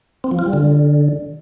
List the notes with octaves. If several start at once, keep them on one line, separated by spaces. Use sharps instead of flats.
C4
F3
F4
G3
D3